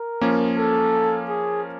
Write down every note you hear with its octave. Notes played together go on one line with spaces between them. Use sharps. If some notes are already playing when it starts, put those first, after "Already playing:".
Already playing: A#4
F3 A#3 C#4
A4
G#4